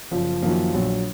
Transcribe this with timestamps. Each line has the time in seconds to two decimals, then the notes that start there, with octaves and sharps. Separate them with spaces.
0.11 F#1 F3
0.42 F#2 D#3 F3 A#3
0.74 A#1 F#3